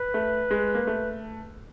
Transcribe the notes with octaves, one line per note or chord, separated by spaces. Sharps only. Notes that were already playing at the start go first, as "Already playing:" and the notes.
Already playing: B4
A3
G#3
A#3
A3